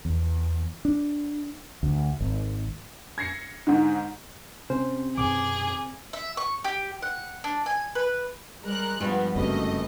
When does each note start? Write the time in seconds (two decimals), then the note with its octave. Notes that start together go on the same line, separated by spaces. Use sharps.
0.05 E2
0.85 D4
1.83 D2
2.20 G#1
3.18 G#6 A#6 C7 C#7
3.67 G#2 D3 D#3
4.70 C3 C4 C#4 C5
5.17 F#2 B2 D#3 G#4 D6
6.13 E5
6.37 C#6
6.64 G4
7.02 F#5
7.44 D4
7.66 G#5
7.95 B4
8.63 G3 G#3 A#4 F#6
9.01 G2 F3 B3
9.36 F#1 F#2 C3 E3 A3 D#5